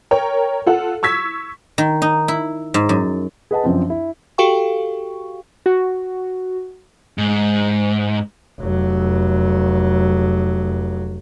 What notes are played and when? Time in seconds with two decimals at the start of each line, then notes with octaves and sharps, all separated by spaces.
0.11 A#4 C#5 G5
0.66 F4 A4 F#5
1.03 C#6 E6 G#6 B6
1.78 D#3
2.02 D#4
2.28 E4
2.74 G#2
2.89 F#2
3.51 G#4 B4 D#5 F#5 A5
3.64 F#2 F3 C4 D4
3.90 E4
4.38 F#4 G4 A4 F5 G5 C#6
5.66 F#4
7.18 G#2
8.60 F1 F#3